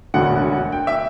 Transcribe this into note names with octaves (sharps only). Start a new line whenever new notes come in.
E1 D2 D3 F#5
G5
E5